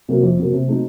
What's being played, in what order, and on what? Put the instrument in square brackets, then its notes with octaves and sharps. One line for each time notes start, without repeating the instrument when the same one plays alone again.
[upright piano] C3 F#3 A#3
F2
C3 F#3 A#3
C3
F#3 A3 C4 D#4